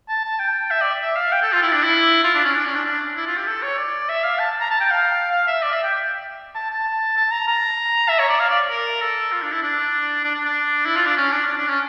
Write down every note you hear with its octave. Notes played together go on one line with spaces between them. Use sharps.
A5
A5
G5
E5
D5
E5
F5
G5
A4
F4
E4
D4
E4
F4
D4
C#4
D4
C#4
D4
D4
E4
F4
G4
A4
C#5
D5
E5
F5
A5
A#5
A5
G5
F5
F5
E5
D5
E5
G5
A5
A5
A5
A#5
A#5
E5
C#5
D5
F5
D5
A#4
A4
F4
D4
E4
D4
D4
D4
D4
E4
F4
D4
C#4
D4
D4
D4
C#4